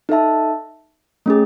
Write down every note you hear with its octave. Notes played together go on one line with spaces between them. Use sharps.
D#4 A4 E5 A5
A3 C#4 G#4